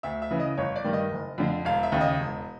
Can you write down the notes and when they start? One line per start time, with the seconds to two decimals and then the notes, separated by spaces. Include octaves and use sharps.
0.03 D2 E5
0.22 E5
0.30 C#3 E3
0.40 D#5
0.58 G1 C#5
0.76 D5
0.84 G2 D#3
0.93 D#5
1.11 F#1
1.38 F2 D3
1.65 E1 F5
1.83 E5
1.92 D#2 C#3
2.01 D#5
2.20 E1